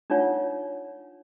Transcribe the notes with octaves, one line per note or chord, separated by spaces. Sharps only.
D4 D#4 F4 C#5 F#5